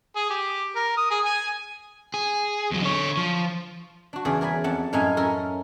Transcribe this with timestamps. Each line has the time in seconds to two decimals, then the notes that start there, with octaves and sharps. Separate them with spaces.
0.16 G#4
0.30 G4
0.75 A#4
0.97 D#6
1.10 G#4
1.25 G#5
2.14 G#4
2.71 E2 F#3
2.83 D3 C#5
3.17 F3
4.13 D4 F#4
4.25 E2 C#3 G#4 D5
4.41 A#4 D5 G#5 B5
4.64 F2 F#5 A5
4.93 F#2 A2 D#4 E4 F5 G#5
5.17 C#4 A4 A#4